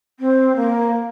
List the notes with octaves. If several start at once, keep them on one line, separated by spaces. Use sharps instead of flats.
C4
A#3